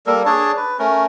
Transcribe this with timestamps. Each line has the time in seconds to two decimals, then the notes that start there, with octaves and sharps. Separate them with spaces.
0.07 G3 A#3 A4 A#4
0.26 D4 G#4 C#5 A5
0.57 B4
0.79 A3 C#4 A#4